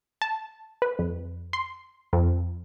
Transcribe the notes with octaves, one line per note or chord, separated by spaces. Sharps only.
A5
B4
F2
C6
F2